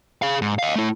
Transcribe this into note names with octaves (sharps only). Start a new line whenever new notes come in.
G#4 F5
G#2
D#5 F5
A3 E4